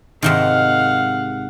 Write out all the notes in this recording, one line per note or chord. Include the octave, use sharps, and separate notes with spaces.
G#2 C3 D#3 F5 F#5